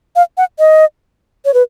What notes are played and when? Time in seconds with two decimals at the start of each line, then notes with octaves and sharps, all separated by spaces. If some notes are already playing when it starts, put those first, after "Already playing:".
0.16 F5
0.38 F#5
0.59 D#5
1.45 C#5
1.54 B4